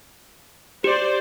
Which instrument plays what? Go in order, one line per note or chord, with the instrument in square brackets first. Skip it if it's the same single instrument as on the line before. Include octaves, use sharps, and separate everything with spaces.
[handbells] G4 [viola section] C5 D5